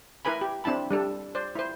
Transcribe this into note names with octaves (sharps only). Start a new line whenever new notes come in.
E4 A#4 B4 G#5 B5
G4
C4 D4 E4 A5 B5
G3 D4 A4
C5 D5
E4 C5